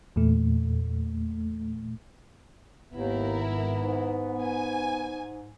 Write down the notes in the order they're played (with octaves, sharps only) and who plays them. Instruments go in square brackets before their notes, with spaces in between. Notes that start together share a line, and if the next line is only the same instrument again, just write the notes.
[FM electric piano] E2 A#2 A3
[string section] G#1 E4 A#4 [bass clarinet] D#2 [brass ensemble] B3
[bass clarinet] G#2
[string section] G#5